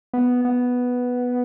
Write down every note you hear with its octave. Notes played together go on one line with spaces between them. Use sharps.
B3
B3